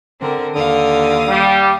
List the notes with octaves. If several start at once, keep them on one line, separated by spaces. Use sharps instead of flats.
D3 C4 A#4
D#2 D3 F5 D#6
G3